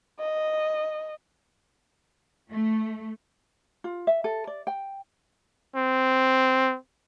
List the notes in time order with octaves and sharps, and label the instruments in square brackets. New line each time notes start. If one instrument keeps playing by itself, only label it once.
[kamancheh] D#5
[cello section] A3
[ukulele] F4
E5
A4
D5
G5
[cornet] C4